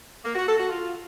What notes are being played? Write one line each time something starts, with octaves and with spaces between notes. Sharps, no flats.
A#3
F#4
A4
F#4
F4